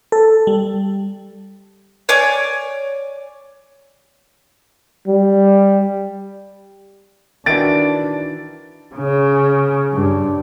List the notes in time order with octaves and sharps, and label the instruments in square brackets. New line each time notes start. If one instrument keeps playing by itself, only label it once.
[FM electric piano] A4
G3
[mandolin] C#5 D5 G#5
[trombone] G3
[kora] D#3 E3 F#4 [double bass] D4 [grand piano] A6 D7
[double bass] C#3
G2